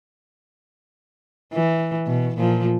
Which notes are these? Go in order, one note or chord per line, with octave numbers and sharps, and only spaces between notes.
E3
B2
A#2 F3